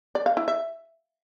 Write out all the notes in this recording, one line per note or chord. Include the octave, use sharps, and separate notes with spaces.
D5
F5
E4
E5